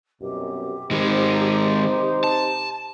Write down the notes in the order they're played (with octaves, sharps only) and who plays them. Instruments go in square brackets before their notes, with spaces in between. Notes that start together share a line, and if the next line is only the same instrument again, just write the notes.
[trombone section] C2 F#2 B2 [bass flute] G4
[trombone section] C3 D#4 C5 [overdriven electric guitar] D#3 G#3
[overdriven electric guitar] A5